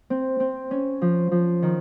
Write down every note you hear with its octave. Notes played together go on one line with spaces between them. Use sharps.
C4
C4
C#4
F3
F3
D#3